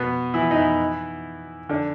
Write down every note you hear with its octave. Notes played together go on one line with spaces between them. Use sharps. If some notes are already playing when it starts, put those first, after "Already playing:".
Already playing: B2 B3
E3 E4
D#4
E3 E4
D3 D4